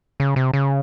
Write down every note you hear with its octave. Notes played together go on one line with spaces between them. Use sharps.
C#3
C3
C#3